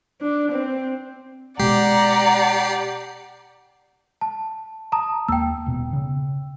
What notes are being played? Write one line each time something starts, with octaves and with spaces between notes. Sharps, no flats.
D4
C4
B2 G#3 G4 D5 F#5 A#5 C7
A5
A5 A#5 D#6
D#2 A#3 G5 E6
D#1 B2 B3
C#3